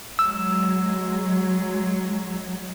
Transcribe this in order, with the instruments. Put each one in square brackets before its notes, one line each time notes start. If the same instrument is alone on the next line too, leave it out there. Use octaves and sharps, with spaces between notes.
[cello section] F#3 G#3 [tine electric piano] E6